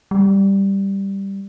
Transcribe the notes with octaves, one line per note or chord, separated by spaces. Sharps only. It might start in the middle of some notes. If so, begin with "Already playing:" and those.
G3